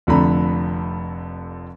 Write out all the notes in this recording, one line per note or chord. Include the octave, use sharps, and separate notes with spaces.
F1 F2 D3 A3 A#5 B5